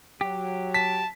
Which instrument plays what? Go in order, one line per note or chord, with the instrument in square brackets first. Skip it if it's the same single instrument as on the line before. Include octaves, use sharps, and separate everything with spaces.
[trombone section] F#3 [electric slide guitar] G4
[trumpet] A5 [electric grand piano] B6